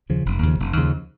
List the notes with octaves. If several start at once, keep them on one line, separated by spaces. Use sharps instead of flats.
D#2 C#3 F3
F1
D#2 C#3 F3
F1
D#2 C#3 F3